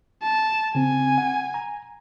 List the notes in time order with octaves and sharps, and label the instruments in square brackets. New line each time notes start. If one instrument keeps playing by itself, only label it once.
[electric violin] A5
[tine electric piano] C#3 C4 [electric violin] G#5
[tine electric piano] F#5
A#5